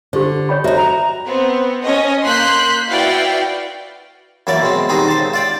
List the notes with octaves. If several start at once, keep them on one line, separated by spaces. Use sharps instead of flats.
D3 G4 C5
C#5 G5 B5
F#4 C5 D#5 E5 A#5
G5 A#5
B3 C4
C#4 D#5
A#3 C6 F#6 G6 B6
E4 F#4 B4 D5 F5 G5
F#2 E3 A#3 C#5 D5
B2 G#3 C4
D#3 G3 C4 D#4 F#4 G#4
C5 A5
C#2
F4 D5 G5